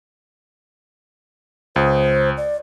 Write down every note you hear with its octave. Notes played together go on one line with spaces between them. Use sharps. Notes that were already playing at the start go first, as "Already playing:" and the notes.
C#2 C5 D#6
D5